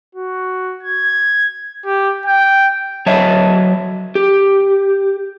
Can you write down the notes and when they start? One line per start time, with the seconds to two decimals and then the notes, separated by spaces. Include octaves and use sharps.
0.15 F#4
0.83 G#6
1.85 G4
2.26 G5
3.06 F#3 C#5 D#5 E5 A5
4.15 G4